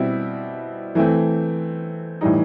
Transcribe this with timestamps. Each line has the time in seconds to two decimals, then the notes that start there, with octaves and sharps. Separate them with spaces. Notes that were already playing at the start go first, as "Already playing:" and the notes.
Already playing: B2 G3 C4 E4
0.95 E3 A3 C4
2.21 A2 E3 G3 D#4